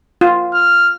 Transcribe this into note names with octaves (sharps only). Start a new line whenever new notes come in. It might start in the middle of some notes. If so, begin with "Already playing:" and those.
F4
F6